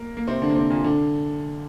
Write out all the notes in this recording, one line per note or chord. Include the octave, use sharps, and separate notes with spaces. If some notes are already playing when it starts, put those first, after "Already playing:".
Already playing: A#3 A#4
A#3
C3 C4
D3 D4
A#3
C3 C4
A#2 A#3
D3 D4